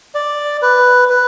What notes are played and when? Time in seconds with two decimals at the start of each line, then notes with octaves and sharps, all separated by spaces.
0.15 D5
0.62 B4
1.09 B4